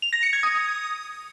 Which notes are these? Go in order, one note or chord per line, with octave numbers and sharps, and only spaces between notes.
F7
A#6
C#7
G#6
D#6